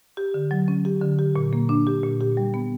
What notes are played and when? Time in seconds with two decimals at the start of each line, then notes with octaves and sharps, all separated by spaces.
0.17 G4
0.34 D3
0.51 F#3
0.68 C#4
0.85 G4
1.02 D3
1.19 G4
1.36 A#2
1.53 A#3
1.69 D4
1.87 G4
2.03 A#2
2.21 G4
2.37 G3
2.54 B3